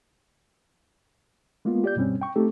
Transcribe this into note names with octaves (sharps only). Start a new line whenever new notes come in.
G#3 A#3 B3 F4
G4 D5 G6
G2 B2 G3 C4 C#4
G5 C#6
A3 C4 D#4 G4 A4